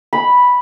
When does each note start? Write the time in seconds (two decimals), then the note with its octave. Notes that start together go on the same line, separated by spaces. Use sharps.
0.13 B5